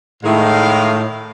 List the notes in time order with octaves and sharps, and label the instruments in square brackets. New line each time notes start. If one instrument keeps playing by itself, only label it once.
[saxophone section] A2 [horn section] D#3 G#3 F5